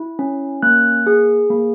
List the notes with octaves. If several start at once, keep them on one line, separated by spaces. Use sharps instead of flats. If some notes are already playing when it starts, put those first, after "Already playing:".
Already playing: E4
C#4
A#3 F#6
G#4
A#3